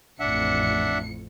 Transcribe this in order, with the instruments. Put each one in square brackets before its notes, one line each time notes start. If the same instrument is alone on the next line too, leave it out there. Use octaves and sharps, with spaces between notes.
[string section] A1 F2 C#7 [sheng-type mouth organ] D4 E5 F#5